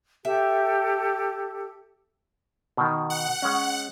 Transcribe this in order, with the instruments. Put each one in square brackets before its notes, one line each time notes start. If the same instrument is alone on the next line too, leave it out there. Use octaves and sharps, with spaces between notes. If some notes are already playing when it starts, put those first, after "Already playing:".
[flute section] G4 A4 [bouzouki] E5
[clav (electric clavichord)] B2 D#3
[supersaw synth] F#5
[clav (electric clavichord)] G#3 C#4